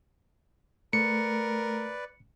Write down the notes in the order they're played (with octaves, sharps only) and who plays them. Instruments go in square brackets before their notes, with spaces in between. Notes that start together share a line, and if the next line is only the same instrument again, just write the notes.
[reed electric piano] A3 [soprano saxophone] A#4 [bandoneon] B4 D5 [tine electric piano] C#7